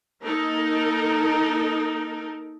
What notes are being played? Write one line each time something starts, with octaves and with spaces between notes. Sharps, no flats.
A#3 D#4 A4 A#4